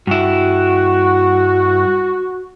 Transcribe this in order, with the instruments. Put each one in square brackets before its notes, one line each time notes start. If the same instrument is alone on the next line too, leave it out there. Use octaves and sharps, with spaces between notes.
[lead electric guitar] G2 E4 [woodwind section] F#4